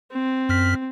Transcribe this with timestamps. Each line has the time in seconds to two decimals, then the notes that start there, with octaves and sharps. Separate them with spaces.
0.12 C4
0.49 F#2 F6 B6